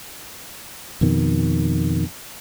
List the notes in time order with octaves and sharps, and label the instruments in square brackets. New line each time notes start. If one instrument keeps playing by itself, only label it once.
[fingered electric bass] F2 B2 D#3